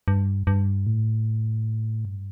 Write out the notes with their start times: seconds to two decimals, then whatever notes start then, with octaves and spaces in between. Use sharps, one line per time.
0.08 G2
0.47 G2
0.87 A2
2.05 G2